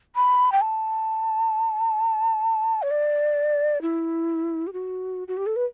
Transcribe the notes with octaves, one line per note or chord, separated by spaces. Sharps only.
B5
G5
A5
C#5
D5
E4
G4
F#4
F#4
G4
A4
B4